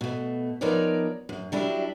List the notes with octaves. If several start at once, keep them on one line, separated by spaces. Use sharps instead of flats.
B2 A3
F3 B3 D#4 A#4 C#5 D5
F#2
F#3 G3 D4 E4